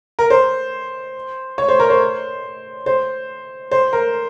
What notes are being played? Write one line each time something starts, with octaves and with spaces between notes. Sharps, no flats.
A#4
C5
C#5
C5
A#4
C5
C5
C5
A#4